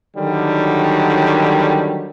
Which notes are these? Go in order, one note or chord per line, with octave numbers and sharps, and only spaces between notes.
D3 D#3 F#3 G3